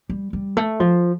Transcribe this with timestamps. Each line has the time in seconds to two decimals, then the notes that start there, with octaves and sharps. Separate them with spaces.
0.09 G3
0.33 G3
0.57 A3
0.80 F3